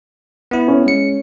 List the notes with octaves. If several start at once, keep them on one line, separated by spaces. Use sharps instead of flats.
B3 E4
C#4
G#3 C#7